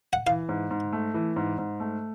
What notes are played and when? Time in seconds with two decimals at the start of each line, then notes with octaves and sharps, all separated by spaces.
0.13 F#5
0.26 E3 F5
0.49 G#2
0.71 G#2
0.93 A3
1.14 E3
1.36 G#2
1.58 G#2
1.80 A3